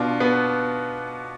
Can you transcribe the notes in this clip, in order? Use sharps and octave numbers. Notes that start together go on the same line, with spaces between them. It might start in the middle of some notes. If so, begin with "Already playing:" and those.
Already playing: B2 D4 F4
B3